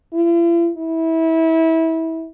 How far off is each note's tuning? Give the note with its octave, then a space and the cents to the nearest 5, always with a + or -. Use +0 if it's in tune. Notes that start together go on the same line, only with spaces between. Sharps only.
E4 +45
E4 -25